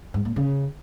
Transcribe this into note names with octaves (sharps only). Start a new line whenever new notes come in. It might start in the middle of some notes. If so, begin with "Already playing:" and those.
G#2
A#2
C#3